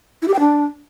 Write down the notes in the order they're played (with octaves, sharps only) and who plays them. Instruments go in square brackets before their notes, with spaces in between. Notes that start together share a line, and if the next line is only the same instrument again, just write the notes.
[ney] E4
G4
G5
D4